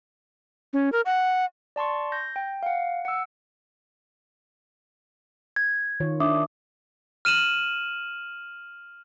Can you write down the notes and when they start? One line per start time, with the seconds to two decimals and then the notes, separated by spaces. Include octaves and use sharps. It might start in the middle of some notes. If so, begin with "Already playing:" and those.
0.73 C#4
0.92 A#4
1.06 F#5
1.76 D5 A5 C6 C#6
2.12 G6 A#6
2.36 G5
2.63 F5 F#5
3.05 F#5 E6
5.56 G#6
6.00 D#3 F4 C#5
6.20 D4 E5 D6 D#6
7.25 F6 D#7 E7 F#7